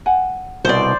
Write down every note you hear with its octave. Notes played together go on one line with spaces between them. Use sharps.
F#5 G#5
C2 B2 C5 D5